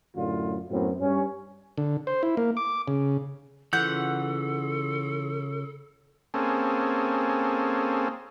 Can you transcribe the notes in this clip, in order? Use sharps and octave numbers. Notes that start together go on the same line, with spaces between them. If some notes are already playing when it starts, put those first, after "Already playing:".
F#2 A2 D3 F4
F#2 A2 B3 C4
G2 C#4
D3
C5
E4
A#3
D6
C#3
C#3 E3 F4 A4 F#5 E6 G6
A#3 C4 C#4 G#4 A4